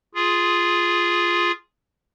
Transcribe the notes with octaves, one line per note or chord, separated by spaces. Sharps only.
F4 G#4